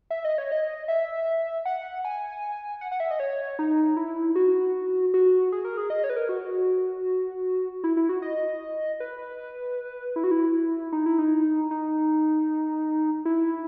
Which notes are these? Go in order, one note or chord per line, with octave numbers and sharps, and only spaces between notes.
E5
D#5
C#5
D#5
E5
F#5
G#5
F#5
F#5
E5
D#5
C#5
D#4
E4
F#4
F#4
G#4
A#4
G#4
D#5
C#5
B4
A#4
F#4
E4
E4
F#4
D#5
B4
E4
F#4
E4
D#4
E4
D#4
D#4
E4